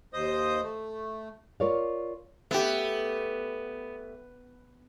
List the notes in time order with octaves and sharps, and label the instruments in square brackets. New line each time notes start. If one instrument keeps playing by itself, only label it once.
[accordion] D#2 C5 D#5 D#6
A3
[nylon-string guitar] F4 A#4 C#5 D5 F5
[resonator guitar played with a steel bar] A3 G4 [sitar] B3